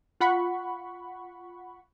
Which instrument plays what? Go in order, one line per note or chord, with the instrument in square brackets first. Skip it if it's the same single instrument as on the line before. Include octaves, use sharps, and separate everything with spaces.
[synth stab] F4 F#5 B5 C#6